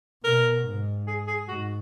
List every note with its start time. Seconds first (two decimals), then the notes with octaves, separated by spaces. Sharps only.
0.24 B2 A#4
0.65 G#2
1.08 G#4
1.27 G#4
1.48 G#2 F#4